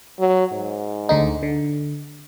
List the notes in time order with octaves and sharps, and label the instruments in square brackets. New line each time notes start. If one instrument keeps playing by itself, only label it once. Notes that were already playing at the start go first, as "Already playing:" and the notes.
[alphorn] F#3
G#2
[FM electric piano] D2 D3 D#4
D3